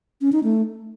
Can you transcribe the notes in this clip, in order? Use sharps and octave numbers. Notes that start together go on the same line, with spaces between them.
C#4
D#4
A3